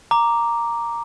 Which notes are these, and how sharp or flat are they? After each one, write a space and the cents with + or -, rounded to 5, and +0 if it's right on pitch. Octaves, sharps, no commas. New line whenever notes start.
A#5 +0 D6 +0